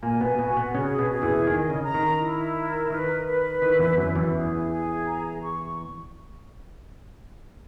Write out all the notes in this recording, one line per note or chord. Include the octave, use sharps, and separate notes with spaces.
A#2 A#3 G#5
B2 B3
B2 B3 F#4
B2 B3
C#3 C#4 G#4
B2 B3
G#4
E2 E3
D#3 D#5
C#3
A#5
D#3
E4
A#4
D#3 B4
B4
D#3 E4
E2 E3
F#2 F#3 C#4
E2 E3
G#4
G#4
A#5
C#6